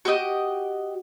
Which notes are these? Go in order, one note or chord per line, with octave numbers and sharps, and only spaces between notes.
F#4 G4 D#5 G5